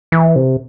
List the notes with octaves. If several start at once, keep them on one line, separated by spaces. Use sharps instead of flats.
E3
C3